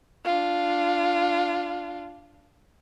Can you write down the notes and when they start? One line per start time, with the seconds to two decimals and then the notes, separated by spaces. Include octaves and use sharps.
0.25 D4 F4